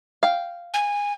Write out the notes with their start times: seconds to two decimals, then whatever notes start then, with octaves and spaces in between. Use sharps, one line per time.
0.23 F5 G5
0.74 G#5